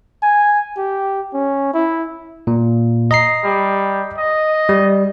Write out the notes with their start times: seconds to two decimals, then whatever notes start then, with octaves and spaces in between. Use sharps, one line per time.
0.22 G#5
0.78 G4
1.34 C#4
1.74 E4
2.47 A#2
3.11 D#5 A#5 C7
3.44 G3
4.18 D#5
4.69 G3